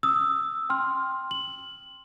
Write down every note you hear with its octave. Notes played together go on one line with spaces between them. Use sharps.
D#6 E6
G5 C6 F6
F#7